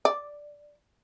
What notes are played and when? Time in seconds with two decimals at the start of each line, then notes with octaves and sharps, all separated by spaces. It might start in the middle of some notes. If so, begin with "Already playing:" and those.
0.05 D5